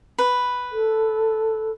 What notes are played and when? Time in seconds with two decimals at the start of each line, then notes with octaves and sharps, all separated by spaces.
0.18 B4
0.71 A4